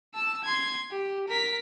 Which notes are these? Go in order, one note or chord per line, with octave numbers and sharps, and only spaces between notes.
A5 E6
C6 G#6
G4
A#4 B6